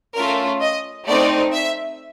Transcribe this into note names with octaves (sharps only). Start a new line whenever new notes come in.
A3 C#4 F4 A#4
D#5
A3 C4 D#4 D5
E5